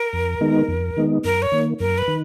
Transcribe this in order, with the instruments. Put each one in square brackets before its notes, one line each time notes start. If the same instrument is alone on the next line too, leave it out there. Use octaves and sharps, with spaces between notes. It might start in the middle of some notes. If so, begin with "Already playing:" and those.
Already playing: [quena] A#4
[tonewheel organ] F2
D#3 G#3 B3 D#4
F2
D#3 G#3 B3 D#4
[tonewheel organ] F#2 [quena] A#4
[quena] C#5
[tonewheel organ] D#3 A#3
[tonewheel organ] F#2 [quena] A#4
[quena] B4
[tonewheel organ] D#3